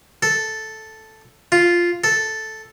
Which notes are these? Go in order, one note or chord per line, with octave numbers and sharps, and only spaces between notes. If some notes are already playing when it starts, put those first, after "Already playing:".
A4
F4
A4